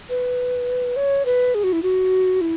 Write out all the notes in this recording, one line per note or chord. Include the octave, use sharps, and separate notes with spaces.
B4
C#5
B4
G#4
F#4
E4
F#4
E4